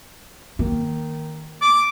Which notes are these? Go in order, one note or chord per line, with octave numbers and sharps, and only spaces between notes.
D#3 A#3
D6